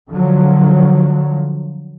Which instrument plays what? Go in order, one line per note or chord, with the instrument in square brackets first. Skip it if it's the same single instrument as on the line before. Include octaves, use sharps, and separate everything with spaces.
[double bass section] D3 F3 F#3